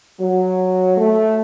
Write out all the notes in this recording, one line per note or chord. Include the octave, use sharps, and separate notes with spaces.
F#3
A3